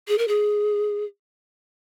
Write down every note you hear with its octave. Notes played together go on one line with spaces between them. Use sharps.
G#4
A#4
G#4